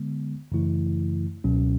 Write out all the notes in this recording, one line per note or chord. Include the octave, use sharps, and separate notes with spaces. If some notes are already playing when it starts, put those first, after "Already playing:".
Already playing: D3 G#3 B3
F#2 C#3 E3 A3 E4
C#2 B2 F#3 C#4